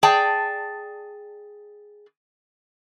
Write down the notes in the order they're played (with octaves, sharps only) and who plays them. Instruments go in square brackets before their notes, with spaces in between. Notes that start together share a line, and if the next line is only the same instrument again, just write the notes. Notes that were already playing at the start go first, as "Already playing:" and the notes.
[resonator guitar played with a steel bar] G#4 D5 G5 A5